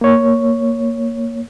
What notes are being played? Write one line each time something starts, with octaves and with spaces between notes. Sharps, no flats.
A#3 C#5